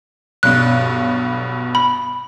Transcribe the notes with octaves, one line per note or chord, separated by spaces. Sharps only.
B1 G2 B2 F#6
B5